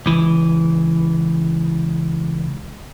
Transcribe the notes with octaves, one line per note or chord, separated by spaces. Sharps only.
C#2 E3